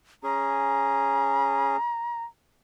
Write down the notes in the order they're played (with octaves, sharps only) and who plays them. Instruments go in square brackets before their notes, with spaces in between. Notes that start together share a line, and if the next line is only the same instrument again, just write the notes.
[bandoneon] C#4 G#4 [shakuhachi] A#5